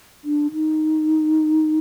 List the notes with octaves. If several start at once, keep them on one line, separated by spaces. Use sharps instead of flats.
D4
D#4